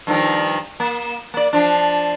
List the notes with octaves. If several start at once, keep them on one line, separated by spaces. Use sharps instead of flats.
G2 D#3 F3
A#3
A#3 D5
F3 D4